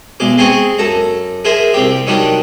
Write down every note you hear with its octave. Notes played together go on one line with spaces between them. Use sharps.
B1 G#3 D6
G#3 C4 G#4 G#5 C#6
F#2 A4 A#5
G#4 A#4 C5 E5 G#5
C2 C4 G4
D#3 F#3 G3 D4